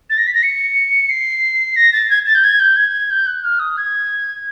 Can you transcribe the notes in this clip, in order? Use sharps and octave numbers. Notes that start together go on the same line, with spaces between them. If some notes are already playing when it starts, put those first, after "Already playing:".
A6
A#6
B6
A#6
C#7
C7
A#6
A6
G#6
A6
G6
G#6
G6
G#6
G6
F#6
F6
D#6
G#6